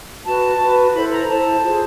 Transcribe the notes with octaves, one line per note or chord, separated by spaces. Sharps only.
F#4 B4 A5
F#4 B4
E4 A4 C5 B5
A#5
E4 A4 C5 A5
F4 G#4 C5